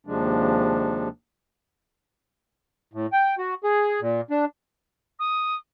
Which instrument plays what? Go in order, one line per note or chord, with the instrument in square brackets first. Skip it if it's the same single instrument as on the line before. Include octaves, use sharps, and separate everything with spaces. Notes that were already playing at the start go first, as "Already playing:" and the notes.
[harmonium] D#2 C3 F3 G#3 D4
[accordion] A2
G5
F#4
G#4
A#2
D4
[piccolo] D#6